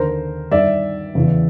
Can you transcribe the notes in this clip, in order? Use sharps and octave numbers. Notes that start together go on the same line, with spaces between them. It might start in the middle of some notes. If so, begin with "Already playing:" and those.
Already playing: D#2 D3 A#4 C5
G2 D#3 D5 E5
E2 C#3 E3